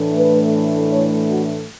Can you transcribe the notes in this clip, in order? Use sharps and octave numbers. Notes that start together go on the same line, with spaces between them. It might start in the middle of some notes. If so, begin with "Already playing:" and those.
Already playing: A2 E3 A3 D4
B4
C#5
F#4